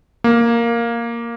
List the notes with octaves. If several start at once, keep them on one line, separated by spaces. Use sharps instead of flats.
A#3